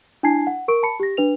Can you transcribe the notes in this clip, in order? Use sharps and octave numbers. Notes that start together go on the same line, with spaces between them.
D4 E4 G#5 A5 G#6 C7
F#5
A#4 C#6 D7
A5 B5 C#7
G4 A#6
D4 B4 F7